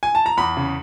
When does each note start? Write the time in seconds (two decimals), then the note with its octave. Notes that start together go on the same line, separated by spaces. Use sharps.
0.03 G#5
0.15 A5
0.26 A#5
0.37 E2 B5
0.57 C#3